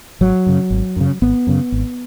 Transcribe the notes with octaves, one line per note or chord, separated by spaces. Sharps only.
G#1 F#3
F#2 C#3
G#1
F#2 C#3
G#1 B3
F#2 C#3
G#1